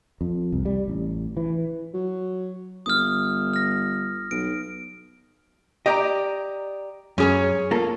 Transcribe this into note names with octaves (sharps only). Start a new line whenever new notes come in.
F2
C2
G3
A1
E3
F#3
G1 D#6 F6
F6 A#6
B1 D7
G4 D5 D#5 A#5
F#2 C#4 G#4 C#5
A#3 F4 A4